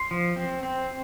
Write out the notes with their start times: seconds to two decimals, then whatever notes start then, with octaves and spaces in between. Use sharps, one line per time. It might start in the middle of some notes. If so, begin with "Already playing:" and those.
Already playing: C6
0.11 F3
0.36 C4
0.63 C4